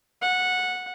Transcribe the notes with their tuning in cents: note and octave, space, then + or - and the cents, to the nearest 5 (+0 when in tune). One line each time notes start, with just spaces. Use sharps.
F#5 -10